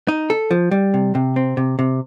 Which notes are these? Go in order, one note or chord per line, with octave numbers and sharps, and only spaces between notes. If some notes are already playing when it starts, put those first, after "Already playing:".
D#4
A4
F3
G3
C3
C3
C4
C3
C3